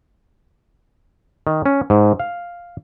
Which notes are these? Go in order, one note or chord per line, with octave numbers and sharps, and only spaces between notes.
D#3
C#4
G#2
F5